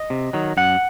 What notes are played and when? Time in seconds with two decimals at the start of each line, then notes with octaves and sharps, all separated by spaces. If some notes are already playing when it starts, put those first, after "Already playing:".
Already playing: D#5
0.10 C3
0.33 D#3 F#3
0.57 F#2 F#5